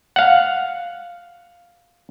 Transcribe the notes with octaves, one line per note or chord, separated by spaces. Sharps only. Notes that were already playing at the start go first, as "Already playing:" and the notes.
F5 F#5